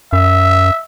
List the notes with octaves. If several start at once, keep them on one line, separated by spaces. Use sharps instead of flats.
F#2 E5